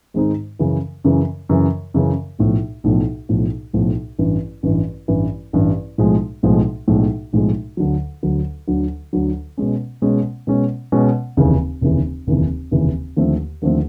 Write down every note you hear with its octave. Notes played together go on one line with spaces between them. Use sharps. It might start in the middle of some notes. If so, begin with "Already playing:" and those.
G#2 D#3 G#3 C4 D#4
F#2 C#3 E3
F#2 C#3 E3
F#2 C#3 E3
F#2 C#3 E3
B1 A2 F3
B1 A2 F3
B1 A2 F3
B1 A2 F3
A1 G2 E3
A1 G2 E3
A1 G2 E3
A1 G2 E3
B1 A2 F3 G#3
B1 A2 F3 G#3
B1 A2 F3 G#3
B1 A2 F3 G#3
D2 D3 F#3
D2 D3 F#3
D2 D3 F#3
D2 D3 F#3
B2 G#3 C#4
B2 G#3 C#4
B2 G#3 C#4
B2 G#3 C#4
F1 D#2 C#3 E3
F1 D#2 C#3 E3
F1 D#2 C#3 E3
F1 D#2 C#3 E3
D#2 D3 F3 A3 C4
D#2 D3 F3 A3 C4